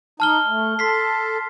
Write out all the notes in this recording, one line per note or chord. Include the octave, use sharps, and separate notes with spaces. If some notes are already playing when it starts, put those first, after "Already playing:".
D#4 A5 F6 G7
A3
A4 C6 B6 C7